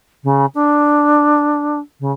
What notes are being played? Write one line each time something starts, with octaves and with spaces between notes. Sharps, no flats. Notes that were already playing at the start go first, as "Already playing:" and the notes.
C#3
D4
C#3